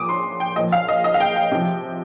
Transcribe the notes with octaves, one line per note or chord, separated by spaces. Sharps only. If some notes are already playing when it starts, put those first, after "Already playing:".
Already playing: A#2 F3 D6 D#6
C6
G5
A#2 F3 D#5
F5
D#5
D#5
F5
G5
G5
C3 F3